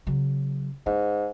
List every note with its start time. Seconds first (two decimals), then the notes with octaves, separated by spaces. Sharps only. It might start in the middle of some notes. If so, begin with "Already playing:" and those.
0.07 C#3 F#3
0.86 G#2 E4